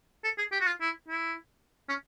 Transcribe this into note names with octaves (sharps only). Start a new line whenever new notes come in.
A4
G#4
G4
F#4
F4
E4
E4
C#4